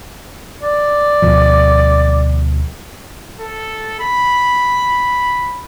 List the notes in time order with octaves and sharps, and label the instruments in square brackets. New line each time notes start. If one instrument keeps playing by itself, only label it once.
[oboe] D5
[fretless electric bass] D2 B2 F3
[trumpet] A4
B5